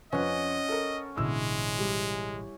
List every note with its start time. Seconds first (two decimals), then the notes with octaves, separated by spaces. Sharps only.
0.12 F2 C#4 B4 D#5 F#5
0.69 A4 A#4
1.18 A1 B2 D3 G#3 E4 E6
1.79 G3